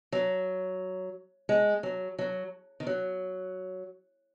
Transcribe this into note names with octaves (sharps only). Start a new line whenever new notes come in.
F#3
G#3
F#3
F#3
D#3
F#3